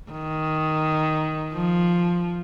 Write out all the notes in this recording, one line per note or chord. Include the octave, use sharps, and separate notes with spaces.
D#3
F3